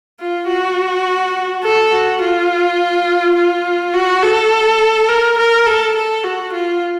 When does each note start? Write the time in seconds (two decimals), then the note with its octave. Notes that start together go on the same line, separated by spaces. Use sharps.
0.20 F4
0.48 F#4
1.63 A4
1.91 F#4
2.21 F4
3.36 F4
3.94 F#4
4.23 A4
5.09 A#4
5.38 A#4
5.66 A4
5.96 A4
6.24 F#4
6.52 F4